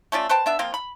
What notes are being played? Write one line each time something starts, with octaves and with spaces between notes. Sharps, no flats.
A3 C#4 F4 D5
B4 C5 G5 A5
B3 D4 E5
F3 A#3 C4 F4
B5